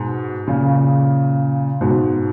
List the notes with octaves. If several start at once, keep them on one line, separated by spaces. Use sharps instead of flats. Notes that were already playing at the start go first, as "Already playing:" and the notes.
Already playing: G#2 B2
A#2 C#3
G#2 B2